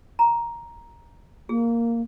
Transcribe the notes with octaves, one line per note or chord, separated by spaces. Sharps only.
A#5
A#3 G#4